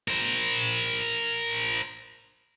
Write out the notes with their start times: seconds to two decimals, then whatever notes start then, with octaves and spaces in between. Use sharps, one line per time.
0.08 A#4 C5